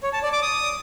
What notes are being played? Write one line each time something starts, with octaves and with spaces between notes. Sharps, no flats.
C#5
A5
D5
D6
D#6